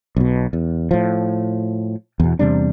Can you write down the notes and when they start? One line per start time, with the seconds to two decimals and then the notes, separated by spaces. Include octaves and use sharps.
0.16 B1 B2
0.53 E2
0.91 A2 F3
2.20 E2 B2
2.39 E2 C3 G3 D4